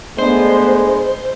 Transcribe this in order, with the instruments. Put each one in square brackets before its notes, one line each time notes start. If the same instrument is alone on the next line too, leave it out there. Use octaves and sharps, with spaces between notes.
[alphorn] G#3 [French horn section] A3 B3 D4 [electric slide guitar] C5